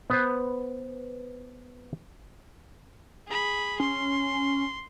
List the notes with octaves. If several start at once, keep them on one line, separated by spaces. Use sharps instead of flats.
B3 B4 C5
G#4 B5
C#4 C6